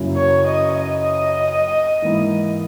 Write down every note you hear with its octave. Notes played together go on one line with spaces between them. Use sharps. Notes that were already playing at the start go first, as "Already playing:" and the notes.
Already playing: F#2 C#3 F#3 A#3 E4
C#5
D#5
D#5
G#2 E3 A#3 E4